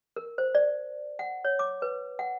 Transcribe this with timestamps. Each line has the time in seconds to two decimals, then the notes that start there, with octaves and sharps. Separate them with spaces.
0.16 A#4
0.38 C5
0.55 D5
1.19 F#5
1.45 C#5
1.59 D6
1.82 B4
2.19 F#5